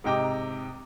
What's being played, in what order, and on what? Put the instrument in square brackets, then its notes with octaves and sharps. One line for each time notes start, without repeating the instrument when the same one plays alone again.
[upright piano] G#2 C3 D#5 G5 A#5 D6